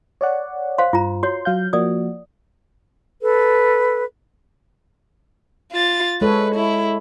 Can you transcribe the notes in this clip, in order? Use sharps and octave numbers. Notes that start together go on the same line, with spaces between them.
C#5 D5 F#5
C5 F5 C6
G2 F4 A#5
F#4 C#5 C6
F#3 F5 G6
F3 A#3 F#4 D5 D#6
A4 B4
F4 A6
G#3 A4 B4 C#5
E4